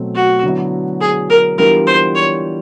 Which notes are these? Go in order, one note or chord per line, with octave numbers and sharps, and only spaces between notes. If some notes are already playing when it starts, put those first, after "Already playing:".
Already playing: B2 F#3 A3 C4
F#4
D3 F#3 B3 E4
G#4
A#4
E3 G3 B3 D4 F4 A#4
C5
C#5